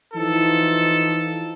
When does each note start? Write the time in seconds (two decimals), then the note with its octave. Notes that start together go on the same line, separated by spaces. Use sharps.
0.14 E3 F3 D#4 A4